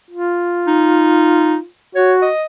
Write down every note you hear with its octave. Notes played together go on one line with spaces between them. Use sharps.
F4
D#4
F#4 C#5
D#5